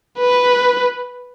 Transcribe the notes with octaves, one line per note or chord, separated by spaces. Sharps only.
B4